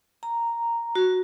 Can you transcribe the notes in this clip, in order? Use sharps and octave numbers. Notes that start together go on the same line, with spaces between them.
A#5
F#4